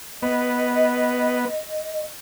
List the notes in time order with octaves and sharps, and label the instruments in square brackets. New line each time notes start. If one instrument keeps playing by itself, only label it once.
[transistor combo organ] B3 [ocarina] D#5